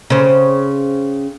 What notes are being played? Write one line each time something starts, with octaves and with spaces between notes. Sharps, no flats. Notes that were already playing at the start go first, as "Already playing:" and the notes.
C#3 C4